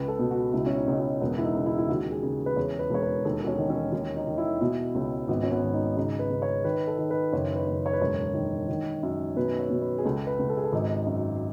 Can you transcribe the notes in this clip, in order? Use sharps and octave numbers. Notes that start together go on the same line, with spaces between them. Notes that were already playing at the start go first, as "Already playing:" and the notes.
Already playing: C#2 B4
A4
B2
F#4
C#2 E4
C#4
D#4
C#2
C#4
E1 B3
E4
D#4
C#3
E4
E4
D#2 F#4
G#4
C#3
B4
E2 C#5
B4
E1 C#5
B4
D#2 A4
B3
C#4
D#3
C#4
D#2 C#4
D#4
D#3
E4
B2 E4
C#2 C#4
G#1 B3
C#4
B3
G#1
D#4
C#3 D#4
B4
C#3
C#5
D#3 B4
A4
D#3
B4
F#1 C#5
B4
F#1
C#5
B4
E1 C#5
D#3
D#3
F#2
B2 B4
C#5
B2
B4
G#4
C#2 A4
B4
C#2
A4
G#4
A4
G#1 D#4
F#2